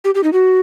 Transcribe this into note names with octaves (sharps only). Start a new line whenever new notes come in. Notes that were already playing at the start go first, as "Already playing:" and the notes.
G4
G4
D#4
F#4